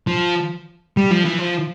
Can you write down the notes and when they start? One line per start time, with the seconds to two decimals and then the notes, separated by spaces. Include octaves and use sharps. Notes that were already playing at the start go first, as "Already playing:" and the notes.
0.07 F3
0.97 G3
1.11 F3
1.25 E3
1.38 F3